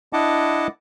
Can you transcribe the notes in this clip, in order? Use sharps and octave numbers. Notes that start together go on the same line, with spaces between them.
D4 E4 D#5 F#5 A5 D6